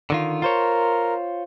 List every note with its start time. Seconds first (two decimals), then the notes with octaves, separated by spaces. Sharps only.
0.10 D3 D#3 F4
0.42 F4 A#4 C5 C#5